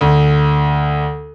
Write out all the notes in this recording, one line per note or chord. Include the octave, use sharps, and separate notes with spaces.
D2